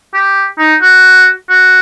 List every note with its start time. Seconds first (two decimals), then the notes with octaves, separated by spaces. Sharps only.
0.14 G4
0.59 D#4
0.82 F#4
1.50 F#4